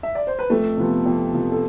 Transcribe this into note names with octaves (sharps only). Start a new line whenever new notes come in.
E5
D5
C5
B4
F2 A3 A4
C3 F3 B3
F2
C3 F3 B3
A4